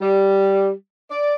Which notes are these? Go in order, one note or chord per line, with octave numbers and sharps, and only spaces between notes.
G3
D5